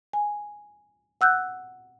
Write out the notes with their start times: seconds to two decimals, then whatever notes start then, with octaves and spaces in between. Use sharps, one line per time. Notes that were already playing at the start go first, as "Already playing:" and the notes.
0.13 G#5
1.21 F#5 E6 F#6 G6